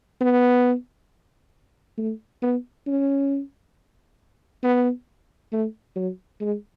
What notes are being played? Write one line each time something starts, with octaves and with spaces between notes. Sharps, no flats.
B3
A3
B3
C#4
B3
A3
F#3
G#3